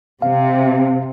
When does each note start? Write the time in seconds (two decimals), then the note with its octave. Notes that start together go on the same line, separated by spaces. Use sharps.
0.22 C3 F5